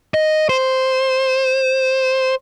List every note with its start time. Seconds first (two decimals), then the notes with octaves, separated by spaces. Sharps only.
0.14 D#5
0.49 C5